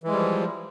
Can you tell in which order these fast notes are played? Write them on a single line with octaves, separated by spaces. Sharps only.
E3 G#3 G3 F3